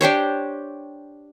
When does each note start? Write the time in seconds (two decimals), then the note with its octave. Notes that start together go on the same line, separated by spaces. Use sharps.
0.01 D4 G4 C5 C#5